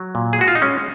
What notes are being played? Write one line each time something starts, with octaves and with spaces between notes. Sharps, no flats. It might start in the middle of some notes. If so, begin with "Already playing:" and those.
Already playing: F#3
A#2
G#4
G#3 F#4
F4
D#4
G#3 C#4